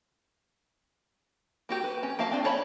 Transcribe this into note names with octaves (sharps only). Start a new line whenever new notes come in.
A#3 F#4 G4
B4
C#4
A#3 F#4 F5 A5
C4 D4 D#4 F4
C#4 C#5 A5 B5